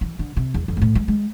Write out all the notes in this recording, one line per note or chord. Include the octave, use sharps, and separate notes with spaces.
E3
D3
C3
E2
F2
G#2
A2
G#3
G#3